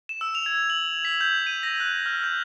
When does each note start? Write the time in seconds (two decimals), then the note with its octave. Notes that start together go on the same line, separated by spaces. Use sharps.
0.09 E7
0.21 E6
0.35 F7
0.46 G#6
0.70 F#7
1.05 B6
1.21 G6
1.47 D#7
1.63 A#6
1.80 F#6
2.06 F6
2.24 G6